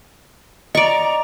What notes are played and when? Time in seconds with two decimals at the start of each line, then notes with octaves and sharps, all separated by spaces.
0.75 D5 D#5 A#5 C#6